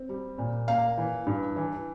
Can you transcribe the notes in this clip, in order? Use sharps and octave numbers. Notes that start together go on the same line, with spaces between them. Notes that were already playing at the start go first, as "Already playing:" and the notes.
Already playing: C4
G3
A#2
A#3 F5
E3
G2
E3